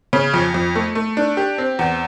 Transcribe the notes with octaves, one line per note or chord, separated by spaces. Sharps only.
C#3
F2
F2
A3
A3
D4
G4
C4
E2